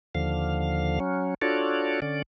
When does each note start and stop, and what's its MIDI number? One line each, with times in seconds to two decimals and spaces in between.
0.15 0.99 39
0.15 0.99 50
0.15 0.99 53
0.15 0.99 77
1.00 1.34 54
1.00 1.34 61
1.42 2.00 62
1.42 2.00 65
1.42 2.00 66
1.42 2.00 69
1.42 2.00 73
1.42 2.00 74
2.02 2.22 50
2.02 2.22 61
2.02 2.22 74